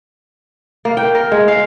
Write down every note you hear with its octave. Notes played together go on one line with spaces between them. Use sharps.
A#3
G5
A#4
G#3
F5